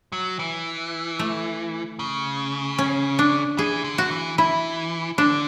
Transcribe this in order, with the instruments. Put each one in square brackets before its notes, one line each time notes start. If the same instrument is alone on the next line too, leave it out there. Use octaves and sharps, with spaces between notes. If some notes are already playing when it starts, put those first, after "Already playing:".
Already playing: [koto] E4
[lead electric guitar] F#3
E3
[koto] A3
[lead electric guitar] C#3
[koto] C#4
D4
[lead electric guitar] E3 [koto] G#4
[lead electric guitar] D3
[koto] F#4
[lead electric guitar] E3
[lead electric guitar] E3 [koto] E4
[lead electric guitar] D3 [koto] D4